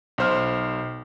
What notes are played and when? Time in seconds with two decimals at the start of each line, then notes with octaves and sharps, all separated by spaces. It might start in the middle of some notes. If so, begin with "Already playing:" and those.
0.18 B1 C5 F6